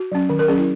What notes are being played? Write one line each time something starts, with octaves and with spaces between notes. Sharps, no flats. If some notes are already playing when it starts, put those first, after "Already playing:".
Already playing: F#4
F#3 C#4
D#3
A#4
F#3 C#4 G#4
E4